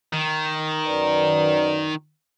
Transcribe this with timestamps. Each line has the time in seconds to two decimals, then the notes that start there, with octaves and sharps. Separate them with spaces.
0.13 D#3
0.86 F#2 B4 D5